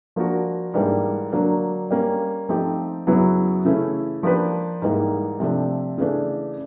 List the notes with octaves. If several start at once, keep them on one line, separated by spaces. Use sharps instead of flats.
F3 A#3 D4 F#4 A#4
G#2 E3 G3 A#3 D4
D3 F#3 A#3 D4
G3 A#3 C#4
F3 A3 C4 D#4 G4
F#2 C#3 F#3 B3 E4
C#3 E3 A3 C#4 E4
F3 A#3 D4 G4 B4
G#2 E3 G3 A#3 D#4
C3 F3 A3 D4
C#3 E3 A3 D4